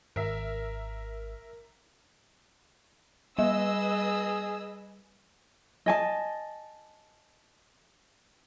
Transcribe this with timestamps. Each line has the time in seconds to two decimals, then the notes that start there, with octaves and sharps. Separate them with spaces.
0.16 G#1 A#4 E5
3.39 G3 G#4 B4 D#5 E6
5.86 D#5 G#5 A5